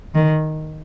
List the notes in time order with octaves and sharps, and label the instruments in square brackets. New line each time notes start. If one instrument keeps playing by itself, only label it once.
[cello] D#3